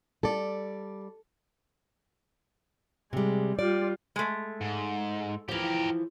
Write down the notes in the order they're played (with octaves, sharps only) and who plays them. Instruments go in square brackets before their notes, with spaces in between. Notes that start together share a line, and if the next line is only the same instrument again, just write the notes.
[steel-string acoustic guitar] G3 D5 [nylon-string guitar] A4
[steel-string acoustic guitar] C3 G3 [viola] G#3
[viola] G3 F4 [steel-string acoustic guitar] D5
[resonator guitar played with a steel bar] G#3 A3
[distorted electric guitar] G#2
[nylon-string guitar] E3 F3 [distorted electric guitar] G4 A#4